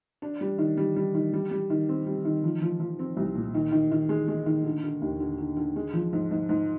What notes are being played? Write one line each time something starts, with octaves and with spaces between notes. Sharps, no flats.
D4
G3
D#3
G3
G3
D#3
G3
G3
D#3
C4
G3
D#3
F3
F3
F3
C4
C2
A#2
D#3
D#3
D#3
G#3
G#3
D#3
D3
D3
D#2
D3
D3
D3
G#3
F3
G#2
G#2
G#2